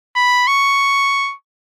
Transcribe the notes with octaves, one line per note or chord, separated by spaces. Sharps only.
B5
C#6